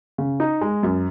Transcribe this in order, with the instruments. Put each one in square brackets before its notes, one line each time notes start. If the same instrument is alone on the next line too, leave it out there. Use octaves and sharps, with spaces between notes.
[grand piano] C#3
D#4
G#3
F#2